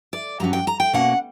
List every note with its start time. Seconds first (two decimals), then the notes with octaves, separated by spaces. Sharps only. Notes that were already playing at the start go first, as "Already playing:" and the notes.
0.13 D5
0.40 G2 F#3 C#4 A#5
0.53 G5
0.67 A#5
0.80 G5
0.93 B2 A#3 C#4 F#5